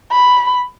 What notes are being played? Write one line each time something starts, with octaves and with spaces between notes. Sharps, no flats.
B5